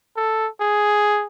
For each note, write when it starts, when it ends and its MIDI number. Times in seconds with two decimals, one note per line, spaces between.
0.16 0.48 69
0.60 1.27 68